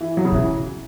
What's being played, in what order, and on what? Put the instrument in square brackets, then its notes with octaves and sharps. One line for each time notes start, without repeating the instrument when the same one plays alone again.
[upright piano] E3
F#3
C#3
[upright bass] B2 [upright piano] E3